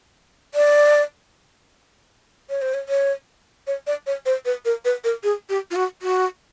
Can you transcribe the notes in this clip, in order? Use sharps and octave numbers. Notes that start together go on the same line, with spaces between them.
D5
C#5
C5
C#5
C#5
C#5
D5
C#5
C5
B4
A#4
B4
A#4
G#4
G4
F4
F#4
F#4